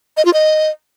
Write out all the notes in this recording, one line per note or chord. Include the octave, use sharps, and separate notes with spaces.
D#5
F4
D#5